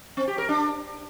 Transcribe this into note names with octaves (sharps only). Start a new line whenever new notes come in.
C4
G4
A#4
D4